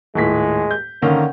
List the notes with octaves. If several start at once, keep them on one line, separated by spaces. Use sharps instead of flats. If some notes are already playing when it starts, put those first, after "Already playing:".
D#1 A2 G#3 B6
G6
D3 D#3 A#3 C#4